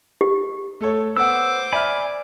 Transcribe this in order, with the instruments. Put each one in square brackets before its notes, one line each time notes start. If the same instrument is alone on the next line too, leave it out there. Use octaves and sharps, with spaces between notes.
[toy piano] G4
[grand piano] A3 A4 C#5
[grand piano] B3 F#5 [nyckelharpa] C5 D6 [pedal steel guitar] E6
[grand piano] D5 E5 F6 [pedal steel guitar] G#5 B5